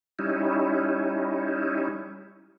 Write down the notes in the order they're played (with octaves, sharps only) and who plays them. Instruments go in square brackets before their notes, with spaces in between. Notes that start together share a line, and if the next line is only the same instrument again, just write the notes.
[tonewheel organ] G3 C#4 D#4 E4